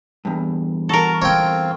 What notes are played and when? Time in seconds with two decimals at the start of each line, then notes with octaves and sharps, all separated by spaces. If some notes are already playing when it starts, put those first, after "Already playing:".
0.25 E2 G2
0.89 F#4 A4 A#4 A#5
1.22 C4 F4 C#5 G5